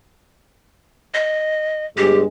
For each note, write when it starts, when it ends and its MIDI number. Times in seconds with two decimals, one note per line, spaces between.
1.14 1.85 75
1.97 2.24 31
1.97 2.24 56
1.97 2.18 67